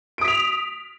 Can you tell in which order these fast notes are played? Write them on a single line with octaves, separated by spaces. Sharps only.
D7 D#6 B6 F7